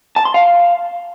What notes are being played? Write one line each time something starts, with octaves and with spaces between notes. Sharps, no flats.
A5
C6
F5